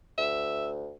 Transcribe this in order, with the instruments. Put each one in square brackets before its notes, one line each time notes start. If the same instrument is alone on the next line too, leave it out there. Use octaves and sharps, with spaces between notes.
[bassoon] D2 [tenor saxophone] E5